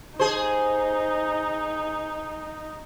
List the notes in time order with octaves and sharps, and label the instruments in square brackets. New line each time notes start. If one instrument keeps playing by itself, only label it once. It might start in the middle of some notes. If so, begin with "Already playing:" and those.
[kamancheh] D#4 [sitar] G#4 C5